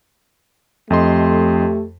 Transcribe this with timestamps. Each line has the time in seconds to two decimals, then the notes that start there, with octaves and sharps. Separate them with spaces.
0.90 F2 A3 G4 D#5 C6